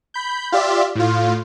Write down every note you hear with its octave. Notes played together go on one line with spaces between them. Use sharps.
B5 G6
F4 G4 D5 E5
A2 F4